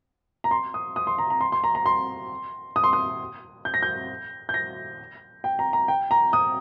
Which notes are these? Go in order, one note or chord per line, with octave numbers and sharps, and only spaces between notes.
A#5
C6
D#6
D#6
C6
A#5
A#5
C6
C6
A#5
A#5
C6
D#6
C6
D#6
G6
A#6
G6
G6
A#6
G5
A#5
A#5
G5
A#5
D#6